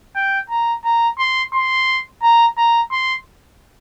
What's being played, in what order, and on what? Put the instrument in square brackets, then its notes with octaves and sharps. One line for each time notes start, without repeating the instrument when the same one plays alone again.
[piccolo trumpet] G5
A#5
A#5
C6
C6
A#5
A#5
C6